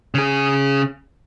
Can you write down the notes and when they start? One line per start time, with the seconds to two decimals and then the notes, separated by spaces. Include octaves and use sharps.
0.14 C#3 G#4